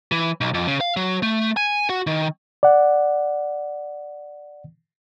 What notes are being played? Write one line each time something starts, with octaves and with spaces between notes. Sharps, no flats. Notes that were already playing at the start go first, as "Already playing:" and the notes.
E3
B1
F2
C#3
F5
F#3
A3
G#5
F#4
D#3
D5 F#5